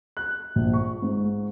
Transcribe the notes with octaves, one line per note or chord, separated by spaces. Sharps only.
F#6
A#1
C#6
G#2